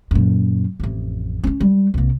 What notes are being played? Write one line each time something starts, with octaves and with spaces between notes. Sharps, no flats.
F#2 A#2
A1 F2
C4 C#4
G3
C2 A#3